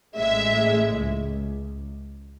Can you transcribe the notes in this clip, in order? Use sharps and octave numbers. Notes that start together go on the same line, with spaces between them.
A1 A2 G#3 E5
C#2